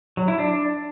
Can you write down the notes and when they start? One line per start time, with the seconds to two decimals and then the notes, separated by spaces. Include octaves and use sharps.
0.17 F#3
0.28 E4
0.39 D4